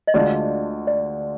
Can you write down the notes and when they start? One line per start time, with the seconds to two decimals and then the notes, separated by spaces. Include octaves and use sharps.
0.07 D#5
0.14 D2 D3 G#3 D4 F4 D5
0.87 D5